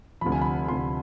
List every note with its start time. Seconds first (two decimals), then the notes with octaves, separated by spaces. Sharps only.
0.21 D2 C3 F3 B5
0.32 G#5
0.42 B5
0.68 D2 C3 F3 C6